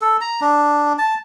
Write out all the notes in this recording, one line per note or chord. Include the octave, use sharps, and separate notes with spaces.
A4
A#5
D4
A5